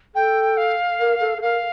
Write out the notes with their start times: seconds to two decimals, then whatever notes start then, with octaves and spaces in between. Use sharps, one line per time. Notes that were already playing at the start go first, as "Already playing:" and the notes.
0.15 A4 G5
0.57 F5
1.00 A#4
1.21 A4
1.38 A4
1.42 A#4 F5